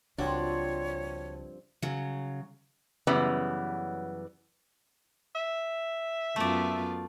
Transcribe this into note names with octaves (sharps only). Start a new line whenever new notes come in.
C#2 G2 F3 C4 D4 F#4 C#5
C#3 F#3
F#2 C#3 E3 G3 B3
E5
F#2 A3 B3 F4 D5